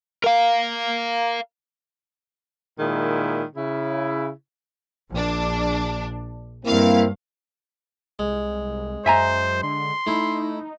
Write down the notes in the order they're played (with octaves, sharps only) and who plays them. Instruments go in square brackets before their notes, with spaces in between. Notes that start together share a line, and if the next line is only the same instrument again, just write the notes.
[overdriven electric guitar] A#4 F5
[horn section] A#2 D#3 G#3 E4
C#3 E4
[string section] A#1 D4
[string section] G2 F5 [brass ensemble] A#3 C4 E4
[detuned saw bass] C2 [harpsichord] G#3
[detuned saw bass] F#2 [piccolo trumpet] C5 [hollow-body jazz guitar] E5 G#5 A#5
[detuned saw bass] D3 [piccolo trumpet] C6
[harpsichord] A3 E4 [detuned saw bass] D#4